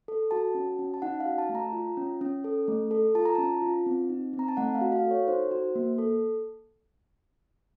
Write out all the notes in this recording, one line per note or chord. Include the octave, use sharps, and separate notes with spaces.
A4
F#4 A5
C#4
C#4
A5
D#4 F#5
F5
F#4
A5
A3
A#5
F4
C#4
C#4
A4
A3
A4
F4 A5
A#5
C#4 A5
F4
C4
D#4
C4
A#5
A5
A3 F#5
F5
F#4
F5
A4
C#5
D#4 C5
F#4
A#3
A4